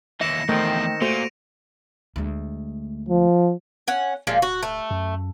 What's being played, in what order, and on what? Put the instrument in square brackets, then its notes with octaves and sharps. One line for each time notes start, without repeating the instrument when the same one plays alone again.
[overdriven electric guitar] D#2 E3 [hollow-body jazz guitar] E5 [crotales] A#6 C#7 E7
[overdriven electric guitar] E2 F3 [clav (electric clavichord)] D#3 C4 G5 [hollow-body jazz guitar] A3
[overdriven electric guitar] A#2 [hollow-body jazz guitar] A3 F#4 C5 [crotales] D7 D#7 F7
[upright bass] D2 G#3
[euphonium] F3
[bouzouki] C#4 F#5
[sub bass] D1 [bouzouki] A#2 F3 G#3
[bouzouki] F#4
A3
[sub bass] F#2